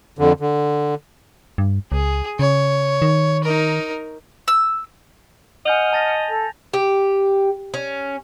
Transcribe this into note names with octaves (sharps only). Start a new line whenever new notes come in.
F2 D3
D3
G2
C#2 G#4
C#3 C#5
D#3
D#4 A#4
E6
D#5 F#5 G#5 F6 G6 F7
A5 A6 A#6
A4
G4
C#4